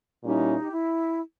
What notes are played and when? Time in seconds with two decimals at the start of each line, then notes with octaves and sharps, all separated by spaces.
0.23 A#2 G3 C#4 D#4 E4
0.61 G4
0.71 E4